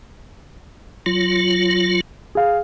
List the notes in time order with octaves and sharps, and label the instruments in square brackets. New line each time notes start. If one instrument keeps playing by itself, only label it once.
[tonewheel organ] F#3 F4
[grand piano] G#4 F5